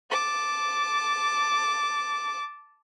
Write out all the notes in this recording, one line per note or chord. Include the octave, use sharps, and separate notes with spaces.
A5 D6